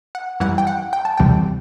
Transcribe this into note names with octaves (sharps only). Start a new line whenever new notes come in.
F#5
F#2 E3 G3 F#5
G5
F#5
G5
A5
D2 C3 E3 G3 G5